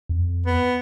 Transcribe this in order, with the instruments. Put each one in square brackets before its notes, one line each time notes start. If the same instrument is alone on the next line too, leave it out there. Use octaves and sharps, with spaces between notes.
[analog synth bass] F2
[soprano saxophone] B3